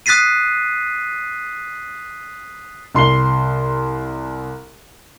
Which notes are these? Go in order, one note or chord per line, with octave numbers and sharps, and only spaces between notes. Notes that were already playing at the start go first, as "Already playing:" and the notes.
D#6 F#6 A6 B6 C7 D#7
C2 C6 C7 G7